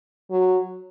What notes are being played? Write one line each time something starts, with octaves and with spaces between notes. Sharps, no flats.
F#3